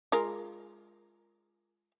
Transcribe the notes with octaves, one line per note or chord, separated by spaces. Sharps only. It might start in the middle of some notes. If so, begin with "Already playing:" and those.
G#3 F4 A#4